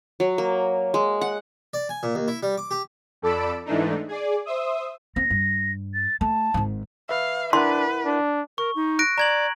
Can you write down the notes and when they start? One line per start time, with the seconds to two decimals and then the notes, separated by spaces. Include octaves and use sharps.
0.20 F#3
0.38 A#3
0.94 G#3
1.21 F#5
1.74 D5
1.89 G#5
2.03 A#2
2.15 D#2
2.28 E4
2.43 G3
2.58 D6
2.71 G4
3.22 F2 A4 D5 B5 E6 D7
3.65 G#2 E3 A3 D4 D#4
4.08 G#4 D5
4.45 C5 E5 D#6
5.16 C4 A#6
5.30 G2
5.94 A6
6.21 A3 A5
6.54 G#1 G#2
7.09 B4 E5 F5
7.53 D4 E4 A#4 B4 F#5 C6
8.05 D4
8.58 A#4 C#6
8.76 D#4
8.99 F#6 A#6 D7
9.18 D5 A#5 G#6 F#7